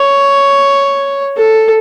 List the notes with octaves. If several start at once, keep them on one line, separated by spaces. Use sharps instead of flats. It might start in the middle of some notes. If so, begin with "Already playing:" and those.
Already playing: C#5
A4